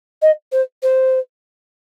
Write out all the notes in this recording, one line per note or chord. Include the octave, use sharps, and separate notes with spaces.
D#5
C5
C5